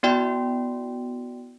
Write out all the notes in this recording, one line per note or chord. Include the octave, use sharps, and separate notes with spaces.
B3 E4 F#4 D5 G5 C6